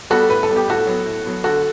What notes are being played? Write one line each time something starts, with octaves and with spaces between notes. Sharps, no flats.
G3 B3 F#4 A4
A2 B4
A4
G3 B3
G4
A2 F#4 A4
F#3 B3
A2
F#3 B3
D3 F#4 A4